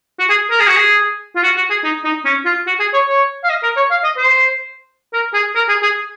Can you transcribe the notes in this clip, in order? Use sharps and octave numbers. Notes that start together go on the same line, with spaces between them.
F#4
G#4
A#4
G#4
F#4
G#4
F4
F#4
F#4
G#4
D#4
D#4
C#4
F4
F#4
G#4
C#5
C#5
F5
D#5
A#4
C#5
F5
D#5
C5
A#4
G#4
A#4
G#4
G#4